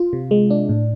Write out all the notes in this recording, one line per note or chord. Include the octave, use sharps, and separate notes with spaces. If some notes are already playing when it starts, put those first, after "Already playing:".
Already playing: F4
C3
G#3
D4
A2